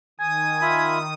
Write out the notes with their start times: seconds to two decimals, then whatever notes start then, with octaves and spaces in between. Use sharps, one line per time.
0.20 D#3 G#5 D#6
0.62 F4 E5 B5